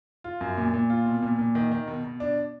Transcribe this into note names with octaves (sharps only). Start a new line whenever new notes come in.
F4
F#2
A#2
A#2
F4
B2
A#2
A#2
D#3
D#3
B2
B2
D4